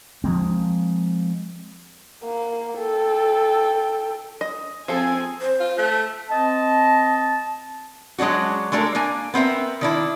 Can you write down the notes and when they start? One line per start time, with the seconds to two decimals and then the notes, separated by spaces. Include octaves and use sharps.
0.24 F3 G#3 A#3 C4
2.24 A#3
2.79 A4 G5
4.41 D#5
4.88 F3 C4 G#4 A4 G#5
5.41 C5
5.60 F4
5.78 A3
6.30 C4 D#5 A5
8.18 F#3 G#3 C#4 D4 F#4
8.72 G#3 A3 D4 F#4 A4 A#4
8.95 A#3 D4 G#5
9.34 B3 C4 A#4 E5
9.81 D#3 D4 E4